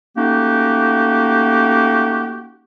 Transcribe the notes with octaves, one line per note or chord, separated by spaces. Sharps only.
A3 A#3 C#4 D#4 F#4 G4